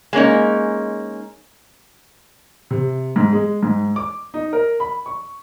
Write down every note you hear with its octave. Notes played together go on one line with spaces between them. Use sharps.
G#3 A#3 C#4 D#4
C3
G#2
G#3
G#2
D6
D#4
A#4
B5
C#6